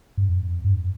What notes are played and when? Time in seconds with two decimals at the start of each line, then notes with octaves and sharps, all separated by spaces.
0.17 G2
0.29 F2
0.64 G2